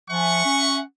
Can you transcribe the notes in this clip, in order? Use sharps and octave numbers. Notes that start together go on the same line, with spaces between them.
F3 E5 F#5 G#5 C#6
C#4